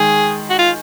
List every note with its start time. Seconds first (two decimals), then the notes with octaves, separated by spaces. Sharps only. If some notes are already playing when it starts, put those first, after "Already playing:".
Already playing: D#3 G#3 G#4
0.50 F#4
0.59 F4